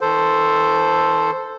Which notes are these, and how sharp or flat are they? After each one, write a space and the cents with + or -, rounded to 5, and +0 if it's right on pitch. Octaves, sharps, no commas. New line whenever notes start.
E3 -45 A4 +0 C5 +0